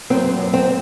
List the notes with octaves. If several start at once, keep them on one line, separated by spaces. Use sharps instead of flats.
F#2 C4
F#2
C4